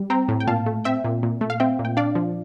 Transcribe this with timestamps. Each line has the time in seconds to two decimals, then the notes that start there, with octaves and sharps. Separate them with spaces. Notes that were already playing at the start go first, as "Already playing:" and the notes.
Already playing: G3
0.10 C4 G5 A#5
0.28 A2
0.40 G5
0.47 A#2 F5 A5
0.66 A3
0.84 C4 E5 G5
1.04 A#2
1.23 A#2
1.41 A3
1.50 F5
1.60 C4 E5 G5
1.79 A#2
1.85 G5
1.97 D4 D5 F5
2.15 F3